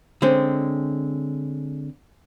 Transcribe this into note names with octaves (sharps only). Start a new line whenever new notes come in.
D3 G#3 C4 C#4